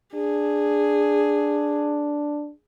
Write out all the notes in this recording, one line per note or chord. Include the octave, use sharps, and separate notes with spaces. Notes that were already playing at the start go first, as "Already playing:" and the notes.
D4 G#4